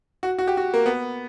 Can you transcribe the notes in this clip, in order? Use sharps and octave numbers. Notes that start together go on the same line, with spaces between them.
F#4
F#4
G4
F#4
A#3
B3